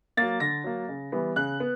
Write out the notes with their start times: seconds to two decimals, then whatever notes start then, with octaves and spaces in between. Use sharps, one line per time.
0.17 A#3 A6
0.22 F#3
0.40 D3 A#6
0.64 F#3 A#3
0.89 C#3
1.12 E3 G3 B3
1.36 C#3 F#6
1.60 B3